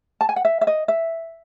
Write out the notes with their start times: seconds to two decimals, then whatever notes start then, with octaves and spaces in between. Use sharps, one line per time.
0.21 A5
0.29 G#5
0.36 F#5
0.45 E5
0.61 E5
0.67 D#5
0.88 E5